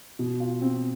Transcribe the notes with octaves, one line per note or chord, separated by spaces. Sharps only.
B2
F4
C4